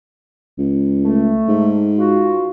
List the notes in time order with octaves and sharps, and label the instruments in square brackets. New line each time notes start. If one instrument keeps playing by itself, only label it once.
[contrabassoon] C#2
[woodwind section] A3
[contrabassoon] G#2
[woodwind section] F4 F#4